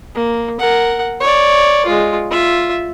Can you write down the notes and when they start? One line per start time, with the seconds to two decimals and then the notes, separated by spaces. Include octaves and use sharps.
0.15 A#3
0.59 A#4 F#5
1.20 C#5 D5
1.85 G#3 F4
2.31 F4 E5